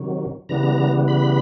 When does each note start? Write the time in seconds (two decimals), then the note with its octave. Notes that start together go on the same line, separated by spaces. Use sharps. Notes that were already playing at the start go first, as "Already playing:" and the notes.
Already playing: C3 D#3 F#3
0.49 C#3 E3 G3 B3 A#5
1.08 B5